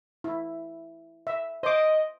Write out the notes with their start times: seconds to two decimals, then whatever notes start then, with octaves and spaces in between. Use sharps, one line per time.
0.24 E4
1.27 E5
1.63 C5 D#5 D6